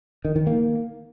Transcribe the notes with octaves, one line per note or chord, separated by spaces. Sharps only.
D#3
D#3
A#3